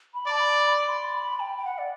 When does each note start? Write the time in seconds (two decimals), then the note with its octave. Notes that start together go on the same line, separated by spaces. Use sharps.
0.14 B5
0.27 D5 A5
0.39 B5
0.64 B5
0.89 C6
1.15 B5
1.40 G5
1.58 G5
1.65 F#5
1.78 D5